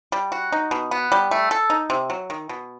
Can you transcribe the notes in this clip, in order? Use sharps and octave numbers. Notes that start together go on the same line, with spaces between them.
G3
F#4
D#4
B2
B3
G3
A3
A4
D#4
C3
F#3
D#3
B2